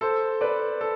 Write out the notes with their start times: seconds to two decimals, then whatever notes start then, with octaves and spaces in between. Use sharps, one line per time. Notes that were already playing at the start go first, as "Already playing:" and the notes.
0.01 A4 C5
0.41 B4 D5
0.81 A4